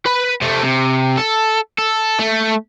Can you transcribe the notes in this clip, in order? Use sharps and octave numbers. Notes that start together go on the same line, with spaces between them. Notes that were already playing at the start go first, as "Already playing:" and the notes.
B4 B5
C3 A3
C3
A4
A4
A3